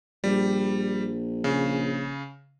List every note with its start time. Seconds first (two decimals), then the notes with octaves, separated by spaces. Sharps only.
0.24 A#1 G3
1.44 C#3